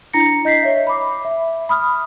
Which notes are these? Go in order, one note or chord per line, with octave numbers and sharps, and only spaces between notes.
D4 E4 A#5 A#6 C#7
D#5 G6 B6 C7
C#5 E5
B5 D6
E5
B5 D#6 F6